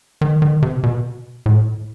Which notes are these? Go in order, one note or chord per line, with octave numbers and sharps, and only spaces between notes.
D#3
D#3
C3
B2
A2